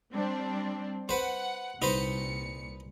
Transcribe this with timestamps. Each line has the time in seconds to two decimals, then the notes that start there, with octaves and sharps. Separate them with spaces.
0.13 G3 C4 D4
1.09 B4 C5 F#5
1.82 C2 A#2 D#4 B4 C5 C#7